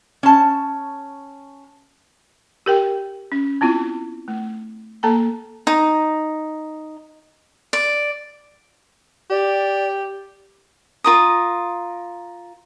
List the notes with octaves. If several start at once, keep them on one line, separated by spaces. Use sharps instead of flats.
C#4 A5
G4 A#4 G5
C#4
B3 C4 E4 F4
A3
A#3 A4 A5 A#5
D#4
D5
G4 D5
F4 A#4 D#6